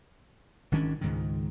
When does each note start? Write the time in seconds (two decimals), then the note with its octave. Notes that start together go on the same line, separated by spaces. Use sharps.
0.72 G#1 D#3 C#4 D4
1.01 C#2 G#2 D#3